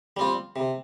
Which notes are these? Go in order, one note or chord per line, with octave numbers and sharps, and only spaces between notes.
G3 C4 F4
C3